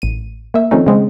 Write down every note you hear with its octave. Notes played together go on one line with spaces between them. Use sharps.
A1 D#7
A#3 E5
D#3 F3 A3 C4 C#4 D#4
C#3 G#3 C4